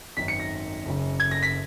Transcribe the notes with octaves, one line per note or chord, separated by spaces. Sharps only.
G#1 F#2 D#3 B6
C#7
A#6
F#1 F#2 C#3
G#6
A#6
B6